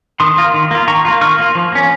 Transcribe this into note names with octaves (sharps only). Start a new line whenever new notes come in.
D#3 C6 D#6
A#3 F4
D#3
A#3 F4
D#3 A#5 C#6
A#3 F4
D#3 C#6 F6
A#3 F4
F3
A#3 C#4